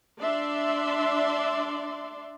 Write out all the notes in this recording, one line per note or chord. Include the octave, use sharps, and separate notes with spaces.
D4 D5 E5 C6